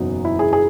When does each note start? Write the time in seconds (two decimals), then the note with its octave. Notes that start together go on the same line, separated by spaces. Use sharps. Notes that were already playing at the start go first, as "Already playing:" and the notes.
Already playing: F#1 E2 B2 F#3 D#4
0.25 E4
0.39 G#4
0.53 G#4